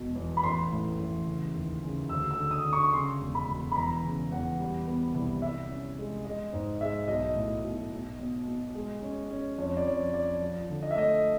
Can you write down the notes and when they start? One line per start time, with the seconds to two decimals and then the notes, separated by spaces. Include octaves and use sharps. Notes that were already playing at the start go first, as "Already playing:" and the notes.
Already playing: E1 B2
0.15 E2
0.37 B5
0.43 A1 C6
0.72 A2
0.99 A1
1.27 C#3
1.54 D#2
1.83 C#3
2.09 D2 E6
2.31 E6
2.37 D3
2.51 D#6
2.65 D3
2.73 C#6
2.93 C#3 C6
3.21 E1
3.35 B5
3.49 E1
3.72 B5
3.76 E2 A#5
4.04 C#3
4.31 E2 F#5
4.59 G3
4.87 B3
5.14 C2
5.42 C2 E5
5.70 C#4
5.98 G#3
6.25 G#3 D#5
6.53 G#2
6.81 G#3 E5
7.08 B1 D#5
7.36 A2
7.64 B1
7.92 B2
8.19 B2
8.47 B2
8.74 G#3
9.02 C#4
9.31 C#4
9.58 F2 C#5
9.77 D5
9.85 F2 C#5
10.13 F3 D5
10.42 F3
10.69 D3
10.83 D#5
10.91 E5
10.96 A3 D#5